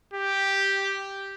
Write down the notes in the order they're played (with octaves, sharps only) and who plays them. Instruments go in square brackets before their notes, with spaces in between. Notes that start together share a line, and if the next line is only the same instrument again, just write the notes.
[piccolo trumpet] G4